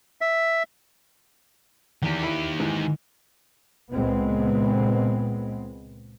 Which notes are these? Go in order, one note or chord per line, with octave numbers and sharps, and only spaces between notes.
E5
E2 D#3 G4
E4 B5
G#2 E3
C#2 A#2 G#3 B3 C4